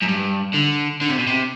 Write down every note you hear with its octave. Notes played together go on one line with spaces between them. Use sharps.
F#2
G2
D3
D3
C3
B2
C3